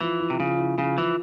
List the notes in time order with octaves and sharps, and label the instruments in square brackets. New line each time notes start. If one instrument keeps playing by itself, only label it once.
[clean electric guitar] E3 [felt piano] F3
[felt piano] E4
[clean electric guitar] C3
[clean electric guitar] C#3 [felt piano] F3
[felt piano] E4
[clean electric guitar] C#3 [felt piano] F3
[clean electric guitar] E3 [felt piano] F3